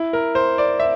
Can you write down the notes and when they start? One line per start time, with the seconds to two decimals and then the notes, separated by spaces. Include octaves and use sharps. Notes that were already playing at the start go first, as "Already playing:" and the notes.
Already playing: E4
0.13 A#4
0.35 C5
0.58 D5
0.80 E5